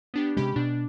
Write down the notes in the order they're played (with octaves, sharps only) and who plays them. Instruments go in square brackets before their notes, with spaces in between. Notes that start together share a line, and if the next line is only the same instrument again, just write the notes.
[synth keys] B3 D4 G4
[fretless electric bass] C3 G#3 [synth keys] C#4 G4 B5
[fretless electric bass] B2 [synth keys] D4